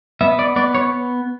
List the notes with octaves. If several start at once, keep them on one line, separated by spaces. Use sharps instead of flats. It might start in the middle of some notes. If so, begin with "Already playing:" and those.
B3 E5
D5
B3 D5
C#5